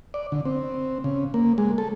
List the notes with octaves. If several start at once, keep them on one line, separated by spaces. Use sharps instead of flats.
D5
D3
C4
C#3
A#3
G#3
A4